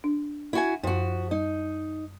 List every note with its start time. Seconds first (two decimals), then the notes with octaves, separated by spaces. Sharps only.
0.04 D4
0.53 E4 F#4 G#5
0.84 F#2 F3 F#4
1.31 G3 D#4